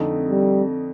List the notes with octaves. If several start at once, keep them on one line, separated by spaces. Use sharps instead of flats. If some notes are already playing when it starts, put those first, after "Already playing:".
Already playing: F2 D3 A3 D#4
G3